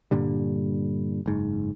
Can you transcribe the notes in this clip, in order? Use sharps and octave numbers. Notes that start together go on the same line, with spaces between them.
G2 A#2 D3 G3
F#1 G#2